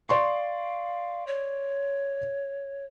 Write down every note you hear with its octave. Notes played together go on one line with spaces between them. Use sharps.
D5 F5 C6 C#6
C#5